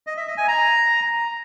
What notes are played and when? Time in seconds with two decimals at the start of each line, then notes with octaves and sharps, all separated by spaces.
0.07 D#5
0.17 E5
0.27 D#5
0.37 G#5
0.48 A#5